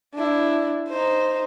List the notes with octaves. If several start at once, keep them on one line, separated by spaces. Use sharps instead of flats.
D4 E4
D#4 C5